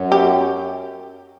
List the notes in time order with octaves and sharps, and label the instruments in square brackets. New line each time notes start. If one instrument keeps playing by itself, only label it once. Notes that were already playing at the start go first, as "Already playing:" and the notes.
Already playing: [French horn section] F#2
[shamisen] G4